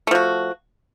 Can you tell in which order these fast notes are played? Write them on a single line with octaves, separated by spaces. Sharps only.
A3 F3 F#4